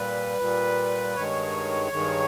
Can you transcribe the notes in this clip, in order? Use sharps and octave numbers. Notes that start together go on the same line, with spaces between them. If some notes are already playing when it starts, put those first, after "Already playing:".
Already playing: A#2 G3 B4
A#2 G3
G2 D#3 G#3 C#5
G2 D#3 G#3